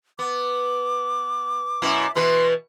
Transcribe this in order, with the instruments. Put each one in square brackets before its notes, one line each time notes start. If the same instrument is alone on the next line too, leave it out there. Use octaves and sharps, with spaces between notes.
[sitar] B3 [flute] D6
[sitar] F#2 B2 E4
[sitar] B2 E3 B4 [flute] C6